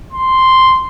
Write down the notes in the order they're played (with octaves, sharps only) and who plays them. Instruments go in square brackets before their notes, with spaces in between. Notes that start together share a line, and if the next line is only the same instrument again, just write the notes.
[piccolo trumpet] C6